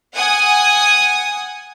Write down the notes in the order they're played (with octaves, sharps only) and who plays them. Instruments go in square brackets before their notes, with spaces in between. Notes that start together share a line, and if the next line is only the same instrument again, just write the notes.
[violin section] F#5 G#5 D#6